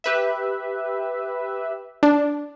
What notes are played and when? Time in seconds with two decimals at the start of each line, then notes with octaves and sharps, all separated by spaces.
0.04 G4 B4 E5
2.03 D4